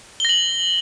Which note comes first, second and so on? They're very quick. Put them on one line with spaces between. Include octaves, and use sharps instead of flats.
G7 A#6 F#7